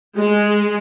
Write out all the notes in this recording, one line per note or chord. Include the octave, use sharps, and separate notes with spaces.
G#3